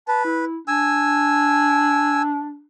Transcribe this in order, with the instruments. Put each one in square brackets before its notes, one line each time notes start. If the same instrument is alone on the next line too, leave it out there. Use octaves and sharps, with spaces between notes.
[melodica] B4 [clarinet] A5
[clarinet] E4
[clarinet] D4 [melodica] G#5 E6